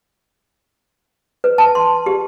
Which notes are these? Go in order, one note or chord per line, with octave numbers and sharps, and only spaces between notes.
B4
A5
C6
G4